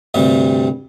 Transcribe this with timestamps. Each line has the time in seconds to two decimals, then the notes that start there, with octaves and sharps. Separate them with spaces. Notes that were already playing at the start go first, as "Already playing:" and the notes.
0.14 D2 G2 C3 G3